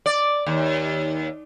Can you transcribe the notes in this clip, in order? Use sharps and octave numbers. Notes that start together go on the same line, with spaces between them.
D5
D#2